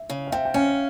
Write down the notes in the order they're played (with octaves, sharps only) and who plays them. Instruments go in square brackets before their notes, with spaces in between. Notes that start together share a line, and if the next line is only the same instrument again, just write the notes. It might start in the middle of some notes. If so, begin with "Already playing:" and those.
Already playing: [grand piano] E5
[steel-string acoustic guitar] C#3
[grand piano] F5
[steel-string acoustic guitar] C3 [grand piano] E5 G5
[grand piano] G5
[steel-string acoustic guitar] C#4 [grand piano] F5 G#5